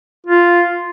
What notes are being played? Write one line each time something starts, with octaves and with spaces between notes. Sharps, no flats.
F4